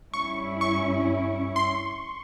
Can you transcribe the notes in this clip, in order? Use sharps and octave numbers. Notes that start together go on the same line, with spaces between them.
G2 G3 C#4 E4 C#6
C#6
C6